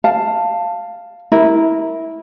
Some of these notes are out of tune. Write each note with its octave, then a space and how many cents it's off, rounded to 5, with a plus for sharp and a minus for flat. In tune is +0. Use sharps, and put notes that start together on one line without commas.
F5 +0 A5 +10
E4 -20 A#4 +0